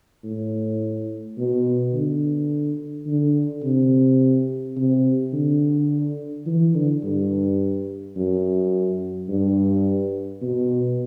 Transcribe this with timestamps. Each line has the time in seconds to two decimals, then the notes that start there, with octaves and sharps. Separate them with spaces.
0.24 A2
1.37 B2
1.93 D3
3.07 D3
3.63 C3
4.76 C3
5.33 D3
6.46 E3
6.74 D3
7.03 G2
8.16 F#2
9.29 G2
10.42 B2